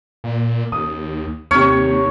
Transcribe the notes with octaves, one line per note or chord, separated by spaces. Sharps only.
A#2
D#2 D#6
D#2 C3 C#5 F6